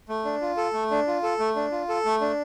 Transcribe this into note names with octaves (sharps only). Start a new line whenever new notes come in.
A3
D4
F4
A4
A3
D4
F4
A4
A3
D4
F4
A4
A3
D4